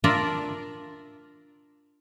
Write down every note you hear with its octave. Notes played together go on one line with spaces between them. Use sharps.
D4 F4 A#4 D5 E5